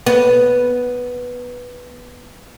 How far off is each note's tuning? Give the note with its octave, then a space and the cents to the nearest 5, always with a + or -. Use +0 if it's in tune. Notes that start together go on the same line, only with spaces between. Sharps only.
B3 -5